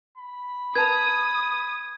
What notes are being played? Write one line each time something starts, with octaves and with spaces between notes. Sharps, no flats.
B5
B4 A5 A#5 D#6 G#6